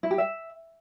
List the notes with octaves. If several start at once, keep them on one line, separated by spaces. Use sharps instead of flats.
E4
G4
E5